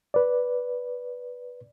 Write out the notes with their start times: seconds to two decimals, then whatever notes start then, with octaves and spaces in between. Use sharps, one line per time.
0.14 B4 D5